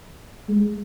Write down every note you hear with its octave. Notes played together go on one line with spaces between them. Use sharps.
G#3